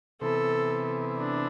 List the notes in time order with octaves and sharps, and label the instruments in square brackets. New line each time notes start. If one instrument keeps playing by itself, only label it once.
[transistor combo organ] C3 E3 B3 [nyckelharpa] A4
[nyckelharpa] D4